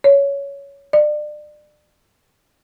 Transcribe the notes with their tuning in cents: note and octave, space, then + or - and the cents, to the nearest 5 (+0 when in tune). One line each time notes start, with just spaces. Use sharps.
C#5 +15
D5 +30